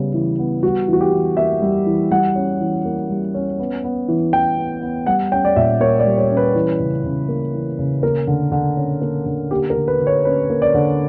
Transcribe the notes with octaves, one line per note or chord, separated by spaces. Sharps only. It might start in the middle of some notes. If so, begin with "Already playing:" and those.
Already playing: C#3 G3 B3
E3
B3
G3 F#4
E3 F#4
G4
E3
A#3 E5
G3
E3
G3 F#5
C#4
E3
A#3
G3
C#4
B3
B3
E3
E3 G5
B3
B3
G3 F#5
C#4 G5
D5
A#2 E5
A#3 C#5
D5
G3
C#5
C#4
B4
E3
C#3
C#3
A#3
E3
C#3
A#3 A#4
D3
D3
C#4
A#3
D3
A#3 G4
A#4
D3
B4
D3
C#5
C#4 B4
A#3
D5
D3